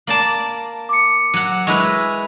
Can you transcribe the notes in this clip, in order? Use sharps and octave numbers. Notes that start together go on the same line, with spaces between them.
A#3 D5 A5
D6 C#7
F#3 F#5
G#3 E4 B4 C#6 F7